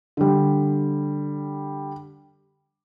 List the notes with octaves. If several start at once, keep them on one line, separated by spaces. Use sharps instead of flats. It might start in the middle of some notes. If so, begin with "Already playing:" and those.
D3 G3